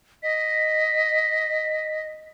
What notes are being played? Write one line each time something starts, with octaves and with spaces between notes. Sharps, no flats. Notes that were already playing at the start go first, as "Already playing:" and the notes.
D#5 B6